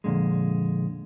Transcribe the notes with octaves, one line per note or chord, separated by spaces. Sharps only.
F2 A#2 D3 G#3